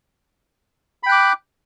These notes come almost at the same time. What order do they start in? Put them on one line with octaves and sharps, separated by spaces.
B5 G5 F#6 D6